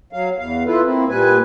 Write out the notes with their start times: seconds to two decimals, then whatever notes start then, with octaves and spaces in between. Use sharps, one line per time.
0.13 F#3 F5
0.39 E2 F5
0.67 E4 F4 A4 B4
0.84 A#3 C4 E4
1.09 A#2 G3 B4 G#5